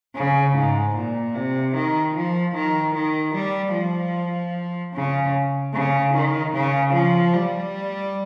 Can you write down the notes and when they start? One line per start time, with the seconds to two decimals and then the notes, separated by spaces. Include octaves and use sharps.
0.16 C#3
0.56 G#2
0.96 A#2
1.35 C3
1.75 D#3
2.15 F3
2.55 D#3
2.95 D#3
3.35 G3
3.75 F3
4.94 C#3
5.74 C#3
6.14 D#3
6.54 C#3
6.94 F3
7.33 G3